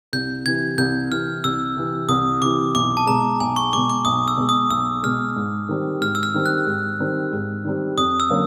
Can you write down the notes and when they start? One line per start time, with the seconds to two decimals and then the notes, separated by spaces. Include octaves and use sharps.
0.13 C2 G6
0.46 C3 E3 G#6
0.78 C2 G6
1.11 C3 E3 F6
1.44 C2 E6
1.77 C3 E3
2.09 C2 D#6
2.42 C3 E3 D6
2.75 B1 D6
2.97 A5
3.07 B2 G#3 A#5
3.40 B1 G#5
3.56 C#6
3.73 B2 G#3 D6
3.89 D6
4.05 B1 D#6
4.28 E6
4.37 B2 G#3
4.49 D#6
4.70 B1 E6
5.03 B2 G#3 F6
5.36 G#2
5.69 D#3 G3 C4
6.01 G#2 F6
6.15 E6
6.23 F6
6.34 D#3 G3 C4
6.46 F#6
6.66 G#2
7.00 D#3 G3 C4
7.33 G#2
7.65 D#3 G3 C4
7.98 F2 D#6
8.20 E6
8.30 D3 F#3 A#3 C#4